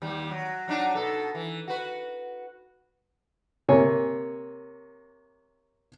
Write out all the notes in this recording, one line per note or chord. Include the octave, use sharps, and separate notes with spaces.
D#2 G3
F#3
F#3 D4 D#4
B2 A4
E3
F#4 B4
C3 A#3 C#5 G#5